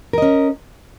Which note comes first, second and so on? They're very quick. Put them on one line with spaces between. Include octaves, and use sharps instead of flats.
A#4 D#5 C#4